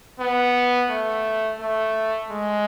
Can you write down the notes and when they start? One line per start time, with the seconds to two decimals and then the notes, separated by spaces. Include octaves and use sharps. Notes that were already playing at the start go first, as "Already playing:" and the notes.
0.20 B3
0.90 A3
1.60 A3
2.30 G#3